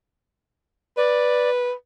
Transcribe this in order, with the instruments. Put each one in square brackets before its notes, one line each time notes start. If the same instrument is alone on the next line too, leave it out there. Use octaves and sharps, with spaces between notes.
[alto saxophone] B4 [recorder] D5